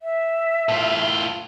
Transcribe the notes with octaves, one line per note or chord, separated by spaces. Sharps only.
E5
A2 F4